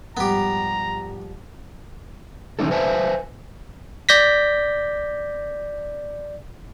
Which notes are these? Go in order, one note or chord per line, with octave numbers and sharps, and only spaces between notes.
G#2 F3 G3 B3 G4 A#5
D3 E3 A3 C#4 D#4 A4
B4 C5 E5 F5 G#5 A5
D5 G6 A#6 B6